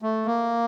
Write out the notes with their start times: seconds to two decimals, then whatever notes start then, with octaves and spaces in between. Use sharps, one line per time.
0.02 A3
0.26 A#3